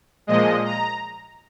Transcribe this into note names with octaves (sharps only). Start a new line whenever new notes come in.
A#2 F3 G#3 D#5
A#5